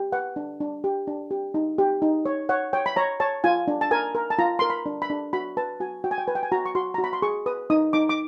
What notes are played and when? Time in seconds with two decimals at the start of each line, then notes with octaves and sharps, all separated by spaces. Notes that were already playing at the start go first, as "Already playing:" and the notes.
Already playing: G4
0.12 B4 F#5
0.36 D4
0.60 D4
0.84 G4
1.07 D4
1.31 G4
1.54 D#4
1.78 G4
2.02 D#4
2.26 C#5
2.49 C#5 F#5
2.73 C#5 G5
2.86 B5
2.96 C#5 A#5
3.20 C#5 A5
3.44 F4 G#5
3.68 D4
3.81 A5
3.91 A#4 G#5
4.15 A#4
4.30 A5
4.39 F4 A#5
4.59 A#4 C6
4.70 B5
4.86 D4
5.02 B5
5.10 D4
5.33 F#4 B5
5.57 B4 A5
5.80 F#4 G#5
6.04 F#4 G5
6.11 G#5
6.18 G5
6.28 B4 G#5
6.35 G5
6.43 G#5
6.52 F#4 A#5
6.66 C#6
6.75 F#4 C6
6.94 F#4 A#5
7.04 B5
7.13 C6
7.22 G#4 C#6
7.46 B4 D#6
7.70 D#4 D#6
7.93 D#4 D6
8.09 D6